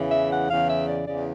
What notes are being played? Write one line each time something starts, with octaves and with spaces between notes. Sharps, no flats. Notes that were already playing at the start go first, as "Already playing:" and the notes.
Already playing: E2 C#3 E3
E5
F#5
E2 C#3 E3 F5
E5
D5
E2 C#3 E3 D5